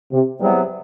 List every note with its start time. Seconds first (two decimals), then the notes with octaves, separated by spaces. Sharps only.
0.12 C3
0.40 E2 C3 F#3 G3 B3 E4